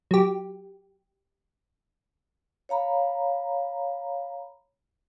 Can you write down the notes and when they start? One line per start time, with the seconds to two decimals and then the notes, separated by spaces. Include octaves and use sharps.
0.11 F#3 G4
2.69 C#5 F5 A#5 B5